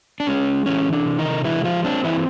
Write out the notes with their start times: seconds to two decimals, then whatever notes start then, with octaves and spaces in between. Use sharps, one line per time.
0.20 D4
0.27 G#3 C#4
0.66 E3 C#4
0.93 D4
1.06 C3
1.18 D#3 D#4
1.44 E3 G#3 E4
1.64 F3 F4
1.84 C4 D4
2.04 E3 E4